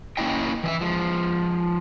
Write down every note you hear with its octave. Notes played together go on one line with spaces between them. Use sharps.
A#3 C#4 D4 E4 D#5 G5
E3 D#5 E5
F3 G#3